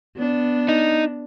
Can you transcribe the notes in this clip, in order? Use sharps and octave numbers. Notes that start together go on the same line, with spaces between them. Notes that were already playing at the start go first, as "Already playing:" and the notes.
B3 D4
D#4